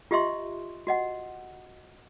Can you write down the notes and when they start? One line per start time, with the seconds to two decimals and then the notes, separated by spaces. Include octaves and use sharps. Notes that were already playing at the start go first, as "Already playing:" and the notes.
0.11 F4 G4 D#5 E5 C6 C#6
0.87 F#4 D#5 F#5